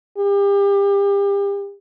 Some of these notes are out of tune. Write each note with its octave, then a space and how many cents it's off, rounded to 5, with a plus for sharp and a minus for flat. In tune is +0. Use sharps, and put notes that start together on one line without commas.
G4 +35